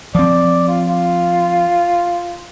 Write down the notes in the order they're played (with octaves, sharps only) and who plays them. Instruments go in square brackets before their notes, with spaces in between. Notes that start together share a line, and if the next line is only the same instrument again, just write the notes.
[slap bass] F3 C4 [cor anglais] D5
[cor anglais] F4
F4